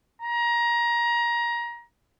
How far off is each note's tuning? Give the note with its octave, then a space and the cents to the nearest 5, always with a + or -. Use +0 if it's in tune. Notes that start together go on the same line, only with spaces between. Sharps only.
A#5 +25